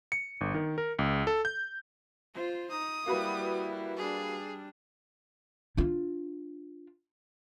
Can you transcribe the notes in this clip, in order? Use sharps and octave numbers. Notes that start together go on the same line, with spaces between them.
C#7
G1
D#3
A#4
C#2
A4
G6
F4 C5
D#4 D#6
G3 A#3 E4 F#4 B4
G3 D4 G#4
D4 F4